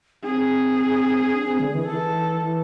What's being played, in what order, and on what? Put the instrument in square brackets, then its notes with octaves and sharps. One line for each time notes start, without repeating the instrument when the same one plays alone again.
[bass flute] C4 [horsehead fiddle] G#4
[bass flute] D4
C4
D3
E3
[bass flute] E3 [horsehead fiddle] A4
[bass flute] E3